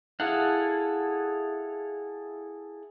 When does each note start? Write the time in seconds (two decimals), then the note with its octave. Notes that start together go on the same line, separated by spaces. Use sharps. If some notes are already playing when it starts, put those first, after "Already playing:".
0.20 E4 G#4 A4 F5 F#5